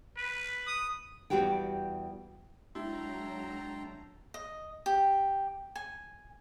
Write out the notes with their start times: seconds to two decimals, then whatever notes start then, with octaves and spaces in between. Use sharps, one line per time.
0.17 B4
0.67 D#6
1.30 E2 F3 G3 F#4 G4 G5
2.75 F#3 G#3 D4 E4 G5 A5 A#5 C6
4.34 D#5
4.86 G4
5.76 G#5